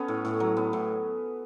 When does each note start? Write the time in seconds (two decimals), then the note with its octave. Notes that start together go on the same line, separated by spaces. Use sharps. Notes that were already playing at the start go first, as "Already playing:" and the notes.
Already playing: B3 C#4 A4
0.08 A2
0.25 A2
0.40 F#3
0.57 B3
0.73 A2